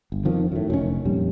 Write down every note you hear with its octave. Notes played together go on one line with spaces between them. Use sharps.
G1
F2 D#3 F3
F#2 A2
F1 D#3 C#4
F2 A#2 G3